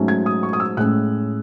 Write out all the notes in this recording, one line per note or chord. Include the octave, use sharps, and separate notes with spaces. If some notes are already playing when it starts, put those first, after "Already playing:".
Already playing: G#2 F#3 A3 C#4
G#6
D#6
C#6
D#6
E6
A2 G#3 C#4 F#6